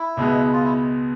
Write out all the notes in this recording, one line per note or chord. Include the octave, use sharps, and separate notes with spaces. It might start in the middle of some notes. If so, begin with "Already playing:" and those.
Already playing: E4
C#2 B2 G#3 B3
F4
E4